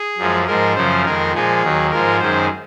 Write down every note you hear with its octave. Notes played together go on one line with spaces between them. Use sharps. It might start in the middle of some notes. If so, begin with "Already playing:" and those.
Already playing: G#4
F#2 F3 G#3
G#2 F3 G#3 A#4
F#2 C#3 F3 C5
F2 D#3 G#3 A#4
A#2 F3 G#3 G#4
D#2 D#3 F#3
G#2 F3 G#3 A#4
F#2 D#3 G#3 C5